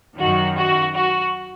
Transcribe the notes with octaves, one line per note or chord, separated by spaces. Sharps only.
F#2 D#3 F#4
F#4
F#4